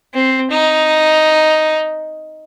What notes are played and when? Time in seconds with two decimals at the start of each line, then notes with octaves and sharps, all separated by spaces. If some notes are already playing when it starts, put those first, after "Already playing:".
0.14 C4
0.51 D#4